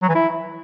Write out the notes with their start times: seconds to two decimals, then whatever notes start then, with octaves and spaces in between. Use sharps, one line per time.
0.03 F#3
0.09 E3
0.15 E4